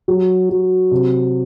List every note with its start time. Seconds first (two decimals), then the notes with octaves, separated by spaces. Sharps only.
0.08 F#3
0.49 F#3
0.91 C3